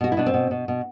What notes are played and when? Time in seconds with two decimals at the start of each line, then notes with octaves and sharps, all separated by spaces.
0.01 B2 F#4
0.12 E4
0.17 B2 D4
0.26 C4
0.34 B2
0.51 B2
0.68 B2